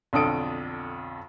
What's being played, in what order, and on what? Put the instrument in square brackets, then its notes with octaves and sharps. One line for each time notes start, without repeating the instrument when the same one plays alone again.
[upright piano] B1 F2 D3 A4 D#6 D7